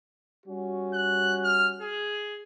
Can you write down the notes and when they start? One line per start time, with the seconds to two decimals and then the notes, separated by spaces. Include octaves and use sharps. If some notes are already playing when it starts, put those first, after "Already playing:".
0.46 G3 C#4 F#4
0.94 F#6
1.44 F6
1.81 G#4